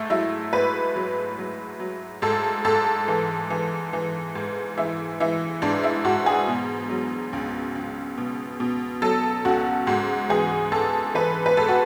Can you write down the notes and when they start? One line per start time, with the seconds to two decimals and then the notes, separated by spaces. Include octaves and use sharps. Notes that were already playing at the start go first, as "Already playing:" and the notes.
Already playing: G#2 A3
0.10 F#3 E4
0.53 G#2 B4
0.96 F#3
1.38 F#3
1.80 F#3
2.22 G#2 A4
2.65 G#2 A4
3.08 E3
3.50 E3
3.93 E3
4.35 G#2
4.78 E3 E4
5.20 E3 E4
5.62 G#2 D4
5.83 E4
6.04 G#2 F#4
6.26 G#4
6.48 B2
6.89 F#3
7.33 C#2
7.75 C#2
8.18 B2
8.60 B2
9.02 F#3 A4
9.45 C#2 F#4
9.87 G#2 F#4
10.29 E3 G#4
10.72 G#2 A4
11.15 E3 B4
11.46 B4
11.57 G#2 A4
11.69 F#4